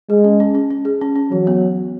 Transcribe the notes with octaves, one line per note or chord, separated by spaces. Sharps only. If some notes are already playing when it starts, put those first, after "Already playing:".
G#3 G#4
C#4
C#4
C#4
C#4
G#4
C#4
C#4
E3 F#3
B3